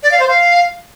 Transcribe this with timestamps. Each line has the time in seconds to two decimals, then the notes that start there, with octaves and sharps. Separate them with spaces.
0.03 D5
0.11 F5
0.20 C5
0.28 F5